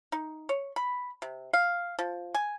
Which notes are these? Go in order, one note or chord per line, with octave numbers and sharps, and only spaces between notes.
D#4
C#5
B5
C3
F5
F3
G#5